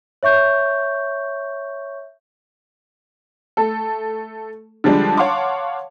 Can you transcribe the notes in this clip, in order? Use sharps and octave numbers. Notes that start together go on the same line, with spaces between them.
C#5 E5 C#6 G6
A3 A4
D3 F3 G3 G#3 D4
C#5 F5 F#5 A5 C6 D6